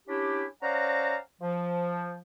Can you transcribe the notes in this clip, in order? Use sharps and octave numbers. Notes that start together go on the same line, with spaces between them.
C#4 D4 E4 G4
C#4 C5 D5 F5 F#5 A#5
F3